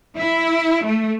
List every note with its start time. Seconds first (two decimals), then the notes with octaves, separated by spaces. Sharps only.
0.17 E4
0.85 A3